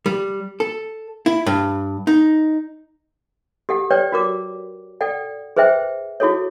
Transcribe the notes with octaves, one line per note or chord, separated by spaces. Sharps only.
G3
A4
E4
G2
D#4
G4 A4 F#5
B4 C#5 D5 G5
F#4 A#4 D6
A4 D5 F#5 G5
G#4 B4 C5 E5 G5
E4 F#4 G#4 A4 C#5